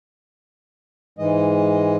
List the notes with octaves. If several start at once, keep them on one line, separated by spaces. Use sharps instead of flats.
G#2 E3 G#3 D#5